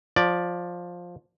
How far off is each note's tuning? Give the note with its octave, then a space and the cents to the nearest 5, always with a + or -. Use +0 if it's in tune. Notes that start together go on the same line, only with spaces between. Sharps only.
F3 +10 D5 +0